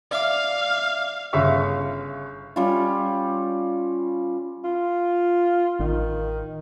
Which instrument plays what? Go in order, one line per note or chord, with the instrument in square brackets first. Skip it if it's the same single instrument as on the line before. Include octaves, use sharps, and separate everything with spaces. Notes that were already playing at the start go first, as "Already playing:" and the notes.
[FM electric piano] D5 E5 D6 [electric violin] F5
[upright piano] G1 C#3 E5 F5 C#6
[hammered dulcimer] G3 C#4 F4
[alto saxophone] F4
[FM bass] A1 [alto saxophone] D#3